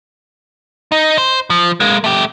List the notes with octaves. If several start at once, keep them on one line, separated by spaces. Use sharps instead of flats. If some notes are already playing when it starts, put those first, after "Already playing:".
D#4
C5
F3
G#3 A#3
A3 G4